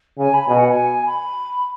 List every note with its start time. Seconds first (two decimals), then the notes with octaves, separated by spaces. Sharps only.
0.18 C#3 G#5
0.33 B5
0.47 B2 G#5
0.58 F#5
0.68 G#5
1.05 B5